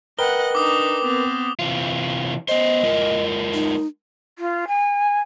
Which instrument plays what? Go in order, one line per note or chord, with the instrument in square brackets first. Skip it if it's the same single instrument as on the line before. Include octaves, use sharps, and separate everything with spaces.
[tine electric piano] A#4 B4 G5 [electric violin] D#5 F#5 [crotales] G7
[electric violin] D4 D#4 [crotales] D6 D#6
[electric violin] B3 C4
[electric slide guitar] C3 E3 F4
[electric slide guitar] B3 C5 [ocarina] D#5
[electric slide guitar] G#3 F4 A#4
[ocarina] D#4
[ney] F4
G#5